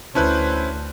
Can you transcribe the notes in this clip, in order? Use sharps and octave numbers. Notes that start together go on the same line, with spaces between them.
D2 C#4 E4 B4 C5 A5 F#6 G6